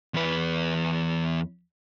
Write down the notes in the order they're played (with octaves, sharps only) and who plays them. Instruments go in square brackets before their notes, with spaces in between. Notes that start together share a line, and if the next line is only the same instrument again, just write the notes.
[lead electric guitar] E2 B4